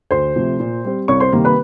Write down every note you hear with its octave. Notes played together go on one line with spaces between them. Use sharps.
D2 C5 C6
C3 F3 A3
A#2
G3 C4
C2 C#5 C#6
C5 C6
C3 D#3 G3 A#3
B4 B5